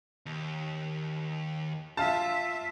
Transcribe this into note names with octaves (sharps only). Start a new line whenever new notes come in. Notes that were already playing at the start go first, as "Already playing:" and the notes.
D#2
F4 E5 F5 A5